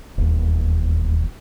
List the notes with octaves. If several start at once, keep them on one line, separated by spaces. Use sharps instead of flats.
E1 D#2